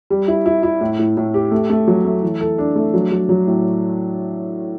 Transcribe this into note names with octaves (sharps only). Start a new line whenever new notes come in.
G3
E4
E4
E4
A2
A2
A2
G4
A3
A3
F#3
A3
E3
A4
D4
A3
F#3
F#3
F#3
A2